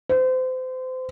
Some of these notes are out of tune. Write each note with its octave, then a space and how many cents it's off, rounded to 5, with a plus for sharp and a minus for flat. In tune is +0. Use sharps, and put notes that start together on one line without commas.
C5 -30